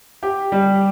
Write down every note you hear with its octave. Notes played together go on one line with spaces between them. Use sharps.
G4
G3